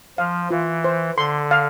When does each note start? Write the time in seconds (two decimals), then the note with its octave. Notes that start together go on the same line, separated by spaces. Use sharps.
0.18 F3 F5
0.50 E3 F4
0.84 C5
1.18 D3 C6
1.51 F5